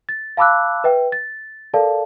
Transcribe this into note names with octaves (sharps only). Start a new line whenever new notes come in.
A6
F5 A5 B5 D6 E6 F#6
B4 E5 G5
A6
A4 A#4 D5 F5 A5